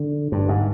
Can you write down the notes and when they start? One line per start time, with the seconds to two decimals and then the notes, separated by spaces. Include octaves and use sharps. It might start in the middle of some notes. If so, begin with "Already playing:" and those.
Already playing: D3
0.32 G2
0.49 G#2